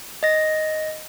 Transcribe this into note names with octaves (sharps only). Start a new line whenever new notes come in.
D#5 A#6